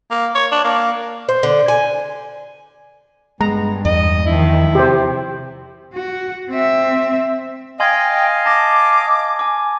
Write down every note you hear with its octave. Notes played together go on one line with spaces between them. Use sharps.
A#3
C#5
D4
A#3
C5
D3
G#5
G2 G#3 B3 A#5
E2 D#5
D#3 F3 E4
C3 G4 C5
F#4
C4 E5
D#5 F5 G5 G#5 C6 G#6
A5 D6 A6 A#6
G#5 D6